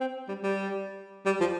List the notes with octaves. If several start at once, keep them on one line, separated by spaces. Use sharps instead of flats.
C4
G3
G3
G3
F3